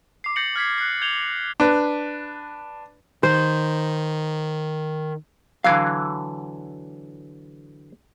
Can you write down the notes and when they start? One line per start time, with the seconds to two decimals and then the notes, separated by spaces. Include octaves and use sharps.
0.24 D6 C7
0.36 G6 A6 A#6 C#7 F#7
0.56 F6 G#6 B6 C7
0.78 F#6 C7
1.01 G6 G#6 F7 G7
1.22 C#7
1.60 D4 B4
3.23 D#3 C5
5.64 D3 E3 F#3 F5